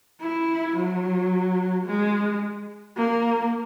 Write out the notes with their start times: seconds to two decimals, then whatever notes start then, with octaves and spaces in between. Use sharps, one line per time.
0.21 E4
0.77 F#3
1.86 G#3
2.97 A#3